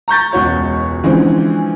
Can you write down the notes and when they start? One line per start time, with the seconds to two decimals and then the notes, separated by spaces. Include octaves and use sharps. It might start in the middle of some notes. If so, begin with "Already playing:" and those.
0.08 A#5 C#6 G6 A6
0.32 E1 C#2 F#4 C#5 C#6
1.03 D3 E3 F3 G#3 C4 C#4